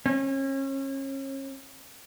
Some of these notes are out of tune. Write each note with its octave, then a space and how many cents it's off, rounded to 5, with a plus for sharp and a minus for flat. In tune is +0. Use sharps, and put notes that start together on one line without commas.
C#4 -35